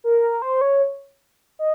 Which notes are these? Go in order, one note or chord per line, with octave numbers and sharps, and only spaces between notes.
A#4
C5
C#5
D#5